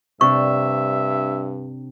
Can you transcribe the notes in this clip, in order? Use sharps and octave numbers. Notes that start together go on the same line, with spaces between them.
G2 C3 D4 E5 C#6